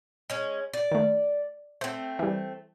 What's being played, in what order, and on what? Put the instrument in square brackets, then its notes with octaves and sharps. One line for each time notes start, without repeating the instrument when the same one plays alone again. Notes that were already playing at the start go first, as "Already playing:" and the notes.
[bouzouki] G#3 C#4
D5
[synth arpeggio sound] D#3 A3
[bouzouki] A3 C4 [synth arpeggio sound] C5
[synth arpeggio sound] E3 G3